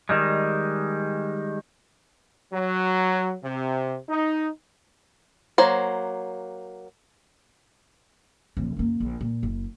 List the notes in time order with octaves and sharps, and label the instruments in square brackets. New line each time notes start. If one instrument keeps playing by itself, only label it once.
[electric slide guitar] D#3 G3 G#3
[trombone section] F#3
C3
D#4
[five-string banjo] F#3 A#3 C5
[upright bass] D#1 F3
F#2 A#3
A#1
A#2
F#1